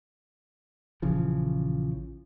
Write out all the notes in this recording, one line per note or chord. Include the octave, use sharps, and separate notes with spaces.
A#1 C#3 E3 F3